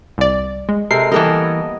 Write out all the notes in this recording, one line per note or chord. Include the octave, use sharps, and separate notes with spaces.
C2 D5
G#3
C3 G#3 A4 A#4 C7
E3 G3 A#3 B3 A4 A#4 D#5